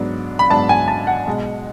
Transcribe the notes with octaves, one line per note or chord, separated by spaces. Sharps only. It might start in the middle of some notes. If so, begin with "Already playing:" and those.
Already playing: G#2 F#3 B3 D4
B5
G#2 F#3 B3 D4 A5
G#5
A5
F#5
B1 B2 G#3